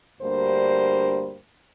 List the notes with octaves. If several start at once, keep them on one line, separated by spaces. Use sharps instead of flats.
D2 G2 G3 A#3 C5